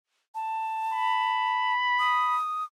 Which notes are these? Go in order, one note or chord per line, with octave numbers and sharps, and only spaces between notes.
A5
B5
D#6